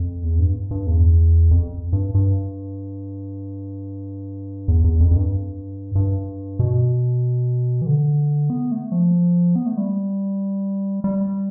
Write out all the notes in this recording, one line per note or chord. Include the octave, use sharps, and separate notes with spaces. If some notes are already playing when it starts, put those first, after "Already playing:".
Already playing: F2
E2
G2
G2
E2
F2
G2
G2
E2
E2
F2
F2
G2
G2
B2
E3
D3
B3
A3
F3
B3
A3
G3
G3